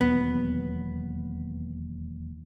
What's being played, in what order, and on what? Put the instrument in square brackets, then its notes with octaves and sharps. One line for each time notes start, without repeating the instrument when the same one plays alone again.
[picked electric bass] E1 D#2 F#3 [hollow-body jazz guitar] B3